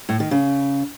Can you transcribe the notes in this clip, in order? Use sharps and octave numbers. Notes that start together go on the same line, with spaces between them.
A2
D#3
C#3